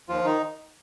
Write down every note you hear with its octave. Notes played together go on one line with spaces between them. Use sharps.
D#2 F3 F4
D#3 D#4